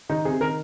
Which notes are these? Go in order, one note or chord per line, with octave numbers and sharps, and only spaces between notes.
D#3 D#4
C3 G#4
D#3 A#4